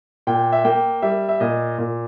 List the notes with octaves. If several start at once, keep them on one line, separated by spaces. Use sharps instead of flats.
A#2 G5
E5
A#3 G5
G3 E5
E5
A#2 D#5
A#2